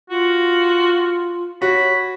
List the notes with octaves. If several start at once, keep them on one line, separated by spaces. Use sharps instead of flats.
F4 F#4
F#4 C#5 B5